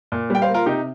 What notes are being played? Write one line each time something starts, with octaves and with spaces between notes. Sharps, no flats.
A#2
G3 G5
C5 F5
A#3
F4 A#4
C3 D#4 G4